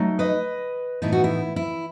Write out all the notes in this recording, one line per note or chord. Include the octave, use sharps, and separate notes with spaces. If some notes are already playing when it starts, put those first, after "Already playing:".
Already playing: F#3 A3 D#4
B4 D#5
A2 E3 B3 D#4 E4
F#4
E4
E4